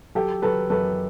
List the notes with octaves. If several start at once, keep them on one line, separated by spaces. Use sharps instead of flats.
F#3 G4 A4
F#3 A4 B4
F#2 A4 B4